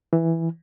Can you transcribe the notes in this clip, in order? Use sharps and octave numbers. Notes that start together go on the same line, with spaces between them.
E3